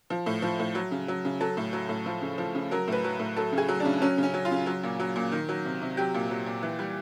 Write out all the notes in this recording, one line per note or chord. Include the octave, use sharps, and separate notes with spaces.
F3
A2
F3
A2
F#3
C#3
F#3
C#3
F#3 A4
A2
F#3
A2
F3
C#3
F3
C#3
F#3 A#4
A2 B4
F#3
A2
F#3 A4
C#3
G#4
F#3
D4
C#3
F#3 C#4
C#3
C#4
F#3
F4
C#3
F#3
A#2
F#3
A#2
D#3
F#3
C3
C3
F#3 G4
A#2
F#3
A#2
E3
G3